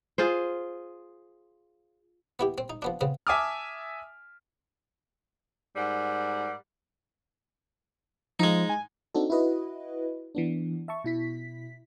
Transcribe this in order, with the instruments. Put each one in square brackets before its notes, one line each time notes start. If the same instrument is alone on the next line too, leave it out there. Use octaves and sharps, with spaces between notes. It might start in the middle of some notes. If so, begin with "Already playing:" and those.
[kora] F4 G#4 C5
[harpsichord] B3 E4 G4
C4
D#4
F3 B3 D4
C#3 B3 C4
[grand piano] E5 G#5 A5 D6 D#6 F6
[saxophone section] G#2 G3 A#4 F#5
[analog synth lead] F3 [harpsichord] G#3 D#4
[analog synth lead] G#5
[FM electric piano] C4 D4 D#4 F#4 A4
E4 F#4 B4 D#5
E3 B3 D4
E5 A5 C#6
B2 E4 B6